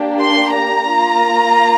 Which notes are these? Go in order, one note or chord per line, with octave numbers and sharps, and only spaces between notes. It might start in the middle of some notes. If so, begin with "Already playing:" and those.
Already playing: A#3 D4 G4
C6
A#5
A#3 F4